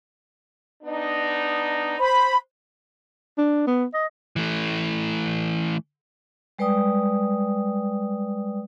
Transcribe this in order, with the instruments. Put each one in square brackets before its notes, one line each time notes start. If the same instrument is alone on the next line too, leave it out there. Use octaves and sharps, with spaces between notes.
[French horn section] B3 D4 D#4
[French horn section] C5 [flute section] B5
[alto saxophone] D4
B3
D#5
[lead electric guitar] E3 A3
[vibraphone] G3 G#3 B4 D5 G5 D#6